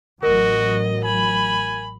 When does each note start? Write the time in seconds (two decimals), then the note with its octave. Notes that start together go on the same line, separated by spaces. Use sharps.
0.23 A1 F#3 F#4 A#4 D#5
1.04 G#5 B5